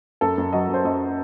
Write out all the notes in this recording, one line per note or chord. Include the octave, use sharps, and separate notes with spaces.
F#2 A4
F#2
F#3 D#5
F#2
C5
F#2 D#5